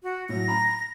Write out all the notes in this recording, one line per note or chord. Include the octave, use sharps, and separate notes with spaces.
F#4
A2 F#3 A#6
A#5 B5